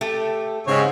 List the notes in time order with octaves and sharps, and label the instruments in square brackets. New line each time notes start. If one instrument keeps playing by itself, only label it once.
[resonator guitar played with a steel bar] A3 G4 A4
[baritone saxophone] G#2 [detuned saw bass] C#3 [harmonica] C4 C#5